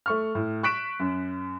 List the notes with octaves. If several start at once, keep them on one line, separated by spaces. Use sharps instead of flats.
A3 C#6 F6
A2
C#6 F#6 B6 D7 E7
F#2